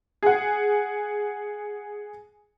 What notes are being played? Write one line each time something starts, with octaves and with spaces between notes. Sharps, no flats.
G#4 F#5